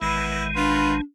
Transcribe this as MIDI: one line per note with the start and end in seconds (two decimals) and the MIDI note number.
0.02 1.01 33
0.02 1.01 51
0.02 1.01 56
0.02 0.45 59
0.02 0.45 64
0.56 0.94 59
0.56 1.02 62
0.56 0.94 65
0.56 0.94 71